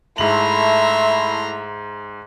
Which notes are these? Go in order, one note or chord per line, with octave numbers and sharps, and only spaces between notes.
G#2 A3 E4 E5 A#5 C6 F#7